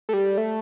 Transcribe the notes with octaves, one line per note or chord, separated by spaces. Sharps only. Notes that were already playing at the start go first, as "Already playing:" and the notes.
A3
G3
A3